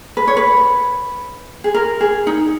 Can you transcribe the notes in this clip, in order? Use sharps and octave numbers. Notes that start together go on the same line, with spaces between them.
B4
C#5
B4
G#4
A#4
G#4
D#4